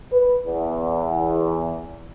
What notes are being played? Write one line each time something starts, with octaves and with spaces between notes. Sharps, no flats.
B4
E2